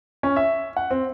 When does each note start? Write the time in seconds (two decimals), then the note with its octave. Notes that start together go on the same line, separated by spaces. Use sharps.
0.23 C#4
0.36 E5
0.77 F#5
0.91 C4